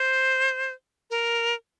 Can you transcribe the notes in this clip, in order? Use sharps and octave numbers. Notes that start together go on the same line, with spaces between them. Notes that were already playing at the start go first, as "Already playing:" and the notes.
Already playing: C5
A#4